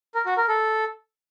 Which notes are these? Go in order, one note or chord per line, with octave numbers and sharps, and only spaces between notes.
A#4
F#4
A#4
A4